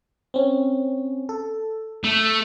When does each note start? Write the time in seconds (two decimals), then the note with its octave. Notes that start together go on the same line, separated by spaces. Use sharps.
0.34 C4 C#4
1.29 A4
2.04 A3